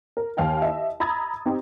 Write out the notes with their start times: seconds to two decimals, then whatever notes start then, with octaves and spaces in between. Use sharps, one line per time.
0.17 A#4
0.37 D#2 F5 G5 G#5
0.62 E4 D#5 E5
1.00 A#5 B5 D#6 E6 G#6 A6
1.46 C4 D#4 G4